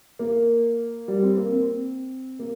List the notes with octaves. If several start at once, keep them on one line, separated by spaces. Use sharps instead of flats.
A#3
G3
C4
A#3
C4
A#3